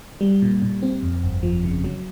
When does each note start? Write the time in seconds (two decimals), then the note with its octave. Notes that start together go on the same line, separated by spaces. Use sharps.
0.21 G3
0.42 A#2
0.62 A#2
0.83 C4
1.02 F2
1.23 G1
1.43 F3
1.64 C#3
1.84 F#3